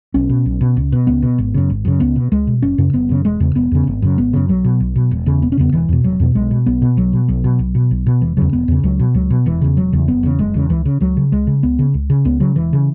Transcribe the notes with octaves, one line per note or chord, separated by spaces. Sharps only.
B1 C#4
B2
B1
B2
C#2
B2
C#2 B3
B2
G#1
F#2 C#3
G#1
F#2 C#3
C#2 B3
B2
C#2 G#3
B2
F#1 C#4
F#2 C#3
F#1 B3
F#2 C#3
E1 G#3
E2 C#3
E1 B3
E2 C#3
G#1
F#2 C#3
G#1 B3
F#2 C#3
B1 F#3
B2
B1
B2
E1
E2 C#3
E1 B3
C#4
E2 C#3 B3
E1 E3
E2 B2
E1 F#3
E2 B2
B1 G#3
B2
B1 B3
B2
B1 F#3
B2
B1 F#3
B2
B1
B2
B1
B2
E1 E3
E2 C#3 F#3
E1 B3
E2 C#3
C#2 F#3
B2
C#2 F#3
B2
E1 E3
E2 C#3
E1 F#3
E2 C#3
F#1 B3
E2 C#3
F#1 G#3
E2 C#3
C#2 E3
C#3
C#2 F#3
C#3
C#2 G#3
C#3
C#2 B3
C#3
C#2
C#3
C#2 B3
C#3 F#3
E1 E3
C#3